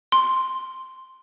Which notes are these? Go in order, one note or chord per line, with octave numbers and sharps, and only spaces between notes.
C6